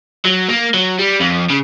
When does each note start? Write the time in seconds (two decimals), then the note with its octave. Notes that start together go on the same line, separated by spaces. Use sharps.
0.25 F#3
0.49 A#3
0.74 F#3
0.99 G3
1.20 F2
1.50 C#3